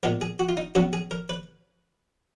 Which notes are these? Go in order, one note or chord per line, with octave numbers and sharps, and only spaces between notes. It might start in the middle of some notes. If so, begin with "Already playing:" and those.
A#2 G#3 B3 A#4
G#4
F#4
F4
D#4
C#2 C#3 F#3 B3 F#4
G#4
A#4
B4